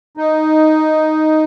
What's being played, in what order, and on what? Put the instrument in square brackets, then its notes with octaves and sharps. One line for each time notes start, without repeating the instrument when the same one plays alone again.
[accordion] D#4